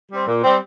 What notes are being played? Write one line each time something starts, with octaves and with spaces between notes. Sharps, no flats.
G3 C4
A#2
G3 C4